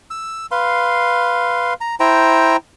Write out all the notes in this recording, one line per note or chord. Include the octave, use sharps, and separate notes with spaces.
E6
B4 F5 C6
A#5
E4 C5 G5 A#5